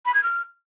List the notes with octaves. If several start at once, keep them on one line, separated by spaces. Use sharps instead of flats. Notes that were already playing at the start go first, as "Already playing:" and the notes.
B5
G#6
F6